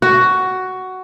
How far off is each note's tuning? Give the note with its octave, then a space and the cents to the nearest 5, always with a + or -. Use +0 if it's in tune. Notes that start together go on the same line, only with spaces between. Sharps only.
F#4 +10